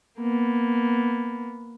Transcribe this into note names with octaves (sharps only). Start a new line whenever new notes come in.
A#3 B3